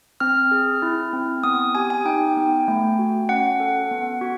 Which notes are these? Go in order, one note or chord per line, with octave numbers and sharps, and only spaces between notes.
C4 F6
G#4
E4
C4
B3 D#6
G4 G#5
G#5
D#4 G5
B3
A3
F#4
C#4 F#5
A4
B3
F#4